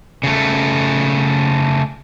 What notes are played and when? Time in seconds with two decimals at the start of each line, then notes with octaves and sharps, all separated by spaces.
0.23 C#3 A3